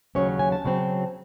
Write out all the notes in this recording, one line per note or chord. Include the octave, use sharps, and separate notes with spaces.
D#2 C#3 F#3 C#4 C#5
G#5
A5
C#3 F#3 C4